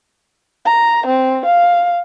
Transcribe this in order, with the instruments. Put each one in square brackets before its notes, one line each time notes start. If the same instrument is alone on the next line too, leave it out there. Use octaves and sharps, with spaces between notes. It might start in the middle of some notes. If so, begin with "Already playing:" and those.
[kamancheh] A#5
C4
F5